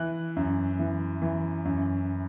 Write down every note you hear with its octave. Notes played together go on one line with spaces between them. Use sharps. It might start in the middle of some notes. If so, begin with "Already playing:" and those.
Already playing: E3 F#6
F#2
E3
E3
F#2